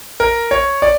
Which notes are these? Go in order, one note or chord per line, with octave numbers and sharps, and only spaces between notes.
A#4
C#5
D5